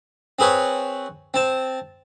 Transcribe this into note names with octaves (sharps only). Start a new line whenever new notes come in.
C4 G#4 B4 C#5
C4 A5